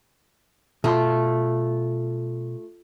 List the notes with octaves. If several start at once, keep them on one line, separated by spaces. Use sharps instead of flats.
B2 A3 F4 A#5 C6